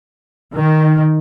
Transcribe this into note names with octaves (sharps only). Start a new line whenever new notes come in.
D#3